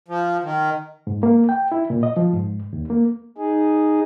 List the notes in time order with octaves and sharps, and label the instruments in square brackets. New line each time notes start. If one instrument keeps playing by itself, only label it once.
[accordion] F3
D#3
[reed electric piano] G#2
A#3
G5
E4
A#2
D#5
F3
G#2
D#2
A#3
[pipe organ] D#4 G#4